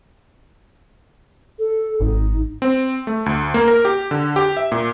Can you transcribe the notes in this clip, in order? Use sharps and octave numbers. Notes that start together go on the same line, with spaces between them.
A4
G#1 D#4
C4
A3
D2
A#3
A#4
G4
D3
G4
E5
A#2